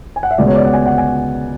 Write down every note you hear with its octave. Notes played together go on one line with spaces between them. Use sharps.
G#5
F#5
E5
C#2 B2 G#3 B3 D5
C#5
D5
F#5
G#5
F#5
G#5